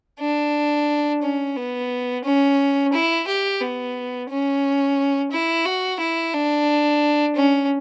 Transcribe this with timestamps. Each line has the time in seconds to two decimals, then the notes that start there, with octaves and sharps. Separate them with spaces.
0.20 D4
1.23 C#4
1.57 B3
2.25 C#4
2.93 E4
3.27 G4
3.61 B3
4.30 C#4
5.32 E4
5.65 F#4
6.00 E4
6.34 D4
7.36 C#4